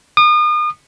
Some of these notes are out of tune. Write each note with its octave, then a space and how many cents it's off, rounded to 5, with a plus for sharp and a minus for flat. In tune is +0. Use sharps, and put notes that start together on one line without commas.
D#6 -40